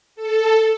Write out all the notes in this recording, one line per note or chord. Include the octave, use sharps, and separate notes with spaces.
A4